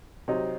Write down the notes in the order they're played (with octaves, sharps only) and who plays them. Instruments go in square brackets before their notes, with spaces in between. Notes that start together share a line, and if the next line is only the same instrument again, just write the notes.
[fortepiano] C3 F#3 C4 D#4